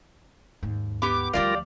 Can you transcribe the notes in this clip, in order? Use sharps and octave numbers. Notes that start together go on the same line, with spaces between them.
D#2 G#2
B3 G4 D6
D2 F3 G3 F4 G4 A#4 D5 F5